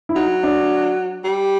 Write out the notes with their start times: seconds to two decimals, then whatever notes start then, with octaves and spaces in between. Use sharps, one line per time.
0.09 E4
0.16 F#3 D#4
0.43 D4
1.24 G3